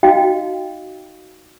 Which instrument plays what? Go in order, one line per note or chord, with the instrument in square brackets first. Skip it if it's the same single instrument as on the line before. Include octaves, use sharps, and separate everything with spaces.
[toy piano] D#4 F#4 D#5 F5 G5